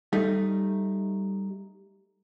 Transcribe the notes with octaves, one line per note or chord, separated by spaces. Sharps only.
G3 A3 D#4